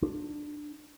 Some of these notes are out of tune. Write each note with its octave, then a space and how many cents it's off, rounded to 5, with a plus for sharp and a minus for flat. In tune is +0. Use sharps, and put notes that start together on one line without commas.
D4 +15